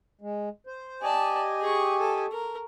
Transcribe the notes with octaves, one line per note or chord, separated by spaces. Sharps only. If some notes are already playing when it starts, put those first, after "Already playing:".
G#3
C5
G4 D5 D#5 G#5 A5
G#4 C#6
A4
A#4